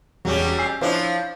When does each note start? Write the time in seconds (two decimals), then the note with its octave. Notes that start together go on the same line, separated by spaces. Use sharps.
0.25 E1 F#3 G3 C#4
0.58 G#5 E6 C7
0.81 F3 D4 E4 F4 C5 C#5